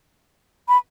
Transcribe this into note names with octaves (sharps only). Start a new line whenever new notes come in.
B5